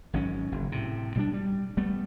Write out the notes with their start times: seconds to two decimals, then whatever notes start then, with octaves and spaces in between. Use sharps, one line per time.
0.13 G#1 G#2 F#3 C#4
0.52 F#1
0.72 A2 C3
1.15 B2 G3 D4
1.33 G3
1.77 G3 A3 B3